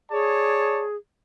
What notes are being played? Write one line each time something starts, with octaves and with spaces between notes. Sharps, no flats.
G#4 C#5 D5 A5